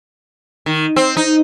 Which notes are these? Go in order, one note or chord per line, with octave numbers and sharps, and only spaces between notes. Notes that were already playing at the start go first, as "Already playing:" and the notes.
D#3
C4
D#4